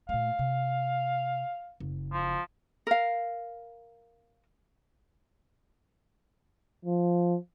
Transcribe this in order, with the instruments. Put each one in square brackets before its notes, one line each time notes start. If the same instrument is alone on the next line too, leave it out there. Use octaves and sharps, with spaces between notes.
[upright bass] A#2 A3 [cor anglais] F5
[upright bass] C3
F#1
[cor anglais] F3
[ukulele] A#4 F5
[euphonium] F3